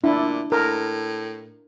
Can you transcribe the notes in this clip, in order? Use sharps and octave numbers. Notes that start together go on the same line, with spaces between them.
A#2 D4 E4
A2 A#4